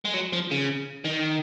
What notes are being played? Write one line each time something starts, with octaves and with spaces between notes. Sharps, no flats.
G#3
F#3
F3
C#3
D#3